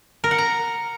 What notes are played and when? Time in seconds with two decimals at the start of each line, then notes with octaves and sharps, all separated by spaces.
0.24 A#4
0.31 F#5
0.38 A#5